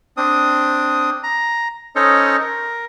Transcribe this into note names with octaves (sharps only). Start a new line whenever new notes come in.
C4 D4 D#6
A#5
C#4 D#4 A4 C5 C#5 D#5
A#4